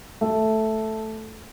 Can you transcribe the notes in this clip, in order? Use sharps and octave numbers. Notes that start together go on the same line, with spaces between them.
A3